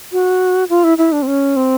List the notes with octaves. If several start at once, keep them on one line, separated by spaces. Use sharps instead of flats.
F#4
F4
E4
E4
D4
C4
C#4
C4